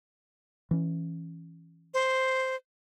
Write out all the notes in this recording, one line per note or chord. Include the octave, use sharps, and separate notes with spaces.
E3 C#4
C5